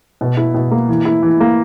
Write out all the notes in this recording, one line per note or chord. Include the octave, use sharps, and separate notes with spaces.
B2
E4
B2
A#3
E3
E4
E3
A#3